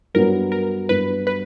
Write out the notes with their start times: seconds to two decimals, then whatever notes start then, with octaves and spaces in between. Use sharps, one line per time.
0.14 G2 F#3 B3 A#4
0.52 A#4
0.89 G2 F#3 B3 B4
1.27 B4